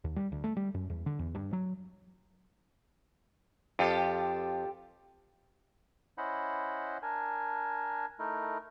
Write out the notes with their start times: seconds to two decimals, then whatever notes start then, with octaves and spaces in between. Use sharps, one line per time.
0.04 D#2
0.16 G3
0.32 D2
0.44 A3
0.57 G3
0.74 F#2
0.90 E2
1.06 D3
1.19 E2
1.35 G2
1.53 F#3
3.79 F2 F4 G4 A4
6.18 C#4 E4 C5 D#5 F#5 B5
7.02 D4 A#4 G#5
8.19 A3 D#4 E4 A#4